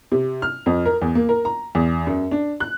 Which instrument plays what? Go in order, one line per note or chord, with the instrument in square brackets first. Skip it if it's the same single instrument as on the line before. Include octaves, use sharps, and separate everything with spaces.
[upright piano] C3
F6
F2
A#4
E2
A#3
A#4
A#5
E2
F#2
D4
F#6